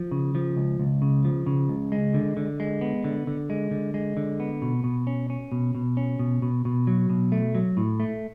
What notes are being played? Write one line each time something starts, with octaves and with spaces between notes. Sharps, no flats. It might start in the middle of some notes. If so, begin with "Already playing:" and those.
Already playing: F3
C#3
F3
C#2
C#2
C#3
F3
C#3
C#2
G#3
D3
D3
G#3
B3
D3
D3
G#3
D3
G#3
D3
B3
B2
B2
C#4
C#4
B2
B2
C#4
B2
B2
B2
F#3
B2
A3
F#3
A2
A3